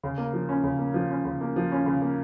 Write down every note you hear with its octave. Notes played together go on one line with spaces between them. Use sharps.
C#3
A#3
F3
C#4
C#3
A#3
F3
C#4
C#3
A#3
F3
C#4
C#3
A#3